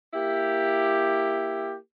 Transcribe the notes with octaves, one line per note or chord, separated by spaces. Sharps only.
A#3 E4 G4